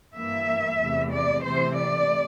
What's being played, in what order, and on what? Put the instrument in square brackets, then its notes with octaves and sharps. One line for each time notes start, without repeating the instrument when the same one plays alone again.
[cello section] G2 E3 A#3 E5
E2 C3 E3 A3
D5
C3 E3 A3 C5
D5